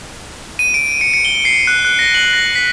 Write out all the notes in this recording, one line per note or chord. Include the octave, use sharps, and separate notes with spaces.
D#7
D7
C#7
C#7
G7
C7
F#6
F#6
A#6
F#7
A#6
B6